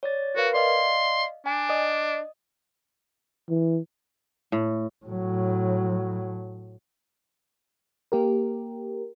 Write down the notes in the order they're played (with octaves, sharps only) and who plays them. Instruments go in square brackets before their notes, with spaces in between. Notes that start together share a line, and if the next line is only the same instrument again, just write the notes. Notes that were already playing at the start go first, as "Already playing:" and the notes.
[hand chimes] C#5 D5 A6
[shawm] F#4 [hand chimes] A#4 B4 F5
[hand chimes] D5 D#5 F5 [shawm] C6
[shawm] D4 [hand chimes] G#5
[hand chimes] D5 D#5 D#6
[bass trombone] E3
[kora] A2
[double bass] A2 F#3
[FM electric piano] A#3 G4 A#4